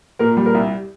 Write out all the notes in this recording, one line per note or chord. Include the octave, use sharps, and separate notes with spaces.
A#2 A#4
G3
A#4
C2